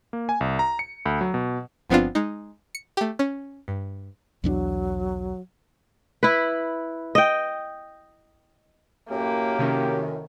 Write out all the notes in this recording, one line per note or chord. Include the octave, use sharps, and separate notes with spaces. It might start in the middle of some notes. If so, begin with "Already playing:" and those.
A#3
G#5
C2
A#5
C#7
D2
F#3
B2
G1 F3 B3 C4 D4 F4
G#3 D#4
C#7
A3 G4
C#4
G2
B1 E2 F#3 D4
E4 B4
D#5 G5
F#2 A2 A#3 G4
C3 D#3 C#4